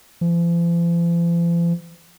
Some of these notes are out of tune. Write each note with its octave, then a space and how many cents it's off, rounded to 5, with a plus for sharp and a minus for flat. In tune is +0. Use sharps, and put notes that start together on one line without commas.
F3 -45